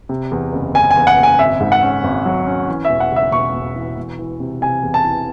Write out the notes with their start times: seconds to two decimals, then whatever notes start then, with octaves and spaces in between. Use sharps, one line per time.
0.09 C3
0.32 E2
0.53 F#1
0.74 F#1 G#5
0.91 G#5
0.96 E2
1.07 F#5
1.17 F#1
1.23 G#5
1.39 G#1 E5
1.61 G#2
1.72 F#5
1.83 C#4
2.04 G#1
2.25 F#3
2.46 C#4
2.68 E3
2.85 E5
2.90 E1
3.00 F#5
3.11 C#3
3.16 E5
3.32 E1 C#6
3.54 E1
3.75 E3
3.97 E1
4.19 E3
4.40 C3
4.61 C3 G#5
4.83 E2
4.94 A5
5.04 E3